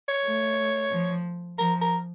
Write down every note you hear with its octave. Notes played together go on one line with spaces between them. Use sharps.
C#5
A3
F3
F3 A#4
A#4